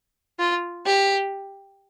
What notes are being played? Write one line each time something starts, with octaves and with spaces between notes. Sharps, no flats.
F4
G4